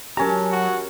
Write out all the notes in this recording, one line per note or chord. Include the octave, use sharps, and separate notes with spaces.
F#3 C#4 G4 A#4 A5 A#5
F#4